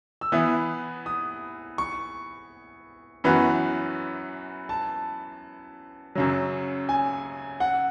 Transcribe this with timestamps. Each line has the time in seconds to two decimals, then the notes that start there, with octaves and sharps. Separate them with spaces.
0.21 E6
0.32 E3 B3 E4 D#6
1.06 D#6
1.78 C#6
3.24 F#2 E3 B3 F#4 B5
4.69 A5
6.15 F#2 C#3 F#3
6.89 G#5
7.60 F#5